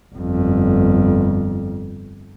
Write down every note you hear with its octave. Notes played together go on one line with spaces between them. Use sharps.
G1 F2